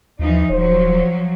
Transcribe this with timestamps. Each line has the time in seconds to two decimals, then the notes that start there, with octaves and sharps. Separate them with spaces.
0.19 D#2 E3 F3 D#4
0.50 D#1 F3 F#3 C5